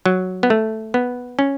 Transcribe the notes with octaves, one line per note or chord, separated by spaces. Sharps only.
F#3
B3
A3
B3
C#4